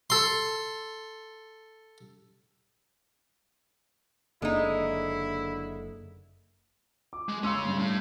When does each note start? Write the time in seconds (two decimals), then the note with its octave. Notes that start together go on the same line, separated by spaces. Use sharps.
0.10 A4 C6
4.42 F#1 D3 G#3 A#3 D#4 E4
7.13 D6
7.29 G#3
7.43 C#4 F5 C6 E6 C#7
7.65 G2
7.79 A2